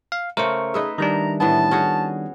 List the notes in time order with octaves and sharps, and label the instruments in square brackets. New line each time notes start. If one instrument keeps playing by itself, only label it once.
[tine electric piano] F5
[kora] C#3 A3 [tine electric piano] A#4 C5 C#6
[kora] D#4 B4 E5 [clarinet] G#4
[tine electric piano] D#3 G3 D4 [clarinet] A#5
[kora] A2 E3 B3 [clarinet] A5
[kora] C#4 F#4 G#4